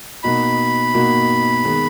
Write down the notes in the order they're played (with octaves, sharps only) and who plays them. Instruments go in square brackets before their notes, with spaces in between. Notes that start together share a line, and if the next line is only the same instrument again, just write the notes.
[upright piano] B2 A#3 D#4 F#4 [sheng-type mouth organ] B5
[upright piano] B2 A#3 D#4 F#4
D#3 G#3 B3